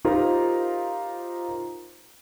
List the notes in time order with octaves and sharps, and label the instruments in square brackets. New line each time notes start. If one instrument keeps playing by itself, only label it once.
[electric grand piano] D#4 F4 G4 A#4 C5 A#5